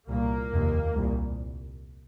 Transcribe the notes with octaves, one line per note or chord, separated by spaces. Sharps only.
C2 A#2 A#3
F1 D#2
C2 A#2